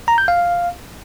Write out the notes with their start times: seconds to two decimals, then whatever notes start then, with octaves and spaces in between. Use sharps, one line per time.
0.08 A#5
0.18 G6
0.28 F5